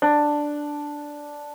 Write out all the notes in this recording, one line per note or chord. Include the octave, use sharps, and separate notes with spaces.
D4